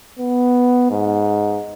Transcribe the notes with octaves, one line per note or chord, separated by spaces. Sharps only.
B3
G#2